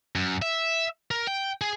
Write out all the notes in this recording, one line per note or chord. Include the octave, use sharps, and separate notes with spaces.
F#2
E5
A#4
G5
G#4